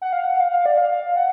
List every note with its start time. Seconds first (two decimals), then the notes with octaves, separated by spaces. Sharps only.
0.02 F#5
0.13 F5
0.24 F#5
0.40 F5
0.52 F5
0.66 D5
0.78 F5
1.16 F#5